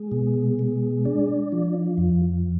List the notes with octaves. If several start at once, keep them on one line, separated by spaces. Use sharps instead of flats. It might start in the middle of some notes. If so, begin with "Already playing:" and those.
Already playing: G#3
B2
G#3
D4
F3
F2